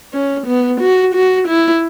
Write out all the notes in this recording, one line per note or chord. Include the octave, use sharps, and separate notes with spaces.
C#4
B3
F#4
F#4
E4